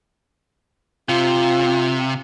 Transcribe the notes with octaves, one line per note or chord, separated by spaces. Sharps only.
C3 F4